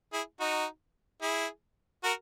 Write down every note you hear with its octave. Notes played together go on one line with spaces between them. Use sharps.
E4 G#4
D#4 F#4
E4 G#4
F#4 A#4